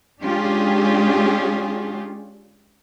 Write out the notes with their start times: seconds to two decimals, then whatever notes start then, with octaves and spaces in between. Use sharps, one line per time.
0.21 G#3 C#4 D4 F4 G4 G#4